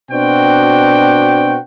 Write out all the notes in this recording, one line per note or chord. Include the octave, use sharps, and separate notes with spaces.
B2 C4 D4 F#4 G5